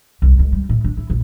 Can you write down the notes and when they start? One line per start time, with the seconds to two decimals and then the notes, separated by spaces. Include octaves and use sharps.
0.22 C2
0.39 C#2
0.52 G3
0.69 A2
0.84 D4
0.97 E4
1.10 A#1